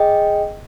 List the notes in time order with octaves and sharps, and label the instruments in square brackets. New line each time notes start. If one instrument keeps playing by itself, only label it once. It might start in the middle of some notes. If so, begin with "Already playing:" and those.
Already playing: [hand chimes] G#4 D#5 G5